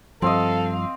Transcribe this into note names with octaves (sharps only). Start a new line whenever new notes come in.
G2 F3 C4 A4 D#5 F5